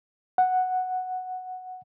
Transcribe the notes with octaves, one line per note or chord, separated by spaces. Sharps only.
F#5